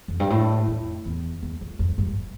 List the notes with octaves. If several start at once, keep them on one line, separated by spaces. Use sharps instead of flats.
F2
G2
A2
F2
E2
E2
F2
F2
G2